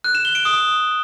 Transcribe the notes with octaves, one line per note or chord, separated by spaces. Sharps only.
F#6
E7
G7
D7
D#6